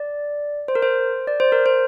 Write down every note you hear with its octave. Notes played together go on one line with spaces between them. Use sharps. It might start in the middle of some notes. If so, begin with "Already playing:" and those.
Already playing: D5
C5
A#4
C5
D5
C5
A#4
C5